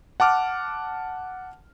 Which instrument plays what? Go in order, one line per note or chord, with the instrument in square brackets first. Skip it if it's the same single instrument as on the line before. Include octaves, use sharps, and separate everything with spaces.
[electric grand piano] F#5 A5 D6 F6